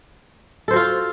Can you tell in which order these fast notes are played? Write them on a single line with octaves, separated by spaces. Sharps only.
A4 C5 F#4 F4